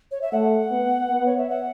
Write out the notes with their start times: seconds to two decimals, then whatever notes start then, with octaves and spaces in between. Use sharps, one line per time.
0.11 C#5
0.22 E5
0.32 A3 F#5
0.71 B3
1.10 B3
1.26 C#5
1.38 E5
1.50 F#5